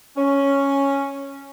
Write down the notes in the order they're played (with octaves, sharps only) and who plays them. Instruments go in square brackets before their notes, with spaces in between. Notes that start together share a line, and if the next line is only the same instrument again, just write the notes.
[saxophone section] C#4